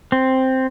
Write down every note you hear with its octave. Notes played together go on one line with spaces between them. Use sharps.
C4